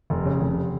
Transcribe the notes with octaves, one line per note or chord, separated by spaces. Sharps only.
F1
C#3
F1